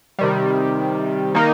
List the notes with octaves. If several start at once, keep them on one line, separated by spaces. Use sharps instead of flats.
C3 D#3 G3
D#3 A#3 D#4